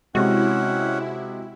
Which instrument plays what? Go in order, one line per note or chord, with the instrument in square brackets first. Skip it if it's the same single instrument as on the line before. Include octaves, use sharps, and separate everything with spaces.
[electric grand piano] C3 G#3 [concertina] C#4 F#5 [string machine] E4 [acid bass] F#4